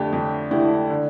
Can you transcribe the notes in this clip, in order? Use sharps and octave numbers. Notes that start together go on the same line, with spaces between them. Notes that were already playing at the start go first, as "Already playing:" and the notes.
Already playing: F2 D3 A3 G4
F2
D3 A3 E4 G4
D3